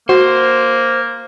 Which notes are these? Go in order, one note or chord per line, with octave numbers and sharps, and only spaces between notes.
A#3 F#4 C5